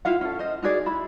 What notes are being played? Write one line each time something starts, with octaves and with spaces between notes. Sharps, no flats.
E4 F4 F5 F#5
C#4 A4
C5 D#5
D#4 F#4 G#4 D5
E4 B5